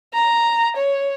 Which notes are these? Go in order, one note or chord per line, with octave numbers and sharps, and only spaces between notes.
A#5
C#5